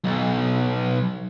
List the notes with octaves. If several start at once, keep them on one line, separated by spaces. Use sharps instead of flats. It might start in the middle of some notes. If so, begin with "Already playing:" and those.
B1